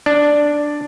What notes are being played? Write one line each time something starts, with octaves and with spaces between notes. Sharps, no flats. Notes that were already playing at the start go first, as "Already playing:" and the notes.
D4